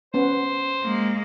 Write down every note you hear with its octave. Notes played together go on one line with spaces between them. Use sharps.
B3 C#4 C5
G#3 A#3